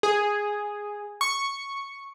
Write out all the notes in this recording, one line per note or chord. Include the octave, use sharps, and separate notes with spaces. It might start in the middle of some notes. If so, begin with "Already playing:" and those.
G#4
C#6